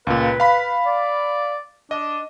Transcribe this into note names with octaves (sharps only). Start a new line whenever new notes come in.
C#2 A#2 B4
F5 B5
D5
D4 D#5